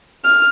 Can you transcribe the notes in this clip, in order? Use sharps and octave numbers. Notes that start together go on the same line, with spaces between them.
F6